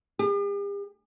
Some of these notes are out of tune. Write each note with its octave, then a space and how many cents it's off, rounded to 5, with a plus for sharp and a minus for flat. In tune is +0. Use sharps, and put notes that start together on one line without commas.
G4 +45